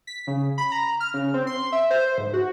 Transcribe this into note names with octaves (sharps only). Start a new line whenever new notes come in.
B6
C#3
B5
A#5
F6
C#3
C4
C6
E5
C5
G#2
F#4